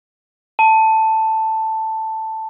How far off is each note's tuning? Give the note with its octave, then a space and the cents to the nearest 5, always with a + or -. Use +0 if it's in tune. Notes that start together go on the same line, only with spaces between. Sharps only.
A5 +5